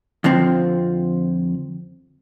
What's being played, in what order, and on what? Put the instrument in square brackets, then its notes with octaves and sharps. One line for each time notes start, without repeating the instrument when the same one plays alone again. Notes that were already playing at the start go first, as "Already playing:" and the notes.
[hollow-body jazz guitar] F2 D3 F3 C4